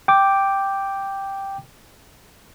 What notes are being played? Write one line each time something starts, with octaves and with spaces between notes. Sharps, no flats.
G5 D6